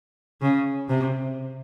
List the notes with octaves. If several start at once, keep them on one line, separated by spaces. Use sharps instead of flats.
C#3
C3